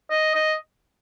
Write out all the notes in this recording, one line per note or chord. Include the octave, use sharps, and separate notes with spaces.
D#5
D#5